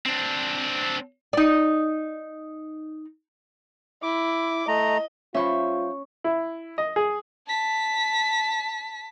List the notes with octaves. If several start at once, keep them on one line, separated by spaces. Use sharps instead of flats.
C4 D4
D#4 D5
E4 D6
A3 D#5 A#5
G3 C#4 F4 C5 E5 C#6
E4
D#5
G#4
A5 B6